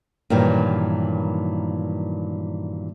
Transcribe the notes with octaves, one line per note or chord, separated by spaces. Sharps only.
G2 A#2 D#3 E3 F#3